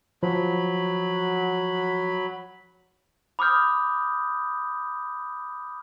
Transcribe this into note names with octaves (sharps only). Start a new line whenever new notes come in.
F3 F#3 B5
B5 D6 D#6 F6 G6